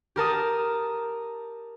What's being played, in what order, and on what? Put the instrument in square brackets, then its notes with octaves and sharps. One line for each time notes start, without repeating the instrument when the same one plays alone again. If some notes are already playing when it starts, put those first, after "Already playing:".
[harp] G4 A#4 A5 D#6